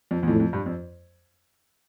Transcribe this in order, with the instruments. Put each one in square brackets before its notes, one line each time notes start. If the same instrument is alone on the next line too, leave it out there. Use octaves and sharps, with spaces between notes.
[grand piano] F2
E2
[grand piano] F2 [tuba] A2
[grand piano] F2
G2
F2